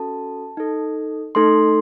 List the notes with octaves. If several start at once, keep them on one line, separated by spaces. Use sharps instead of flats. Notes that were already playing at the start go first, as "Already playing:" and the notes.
Already playing: C#4 F#4 A4 A5
D#4 A4
A3 D#4 A4 C6